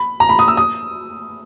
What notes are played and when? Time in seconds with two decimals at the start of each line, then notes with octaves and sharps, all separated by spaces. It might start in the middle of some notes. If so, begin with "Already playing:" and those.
Already playing: B5
0.20 A#5
0.29 B5
0.39 D#6
0.48 E6
0.57 D#6